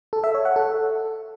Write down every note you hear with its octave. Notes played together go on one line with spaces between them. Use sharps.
A4
E5
C#5
F#5
A4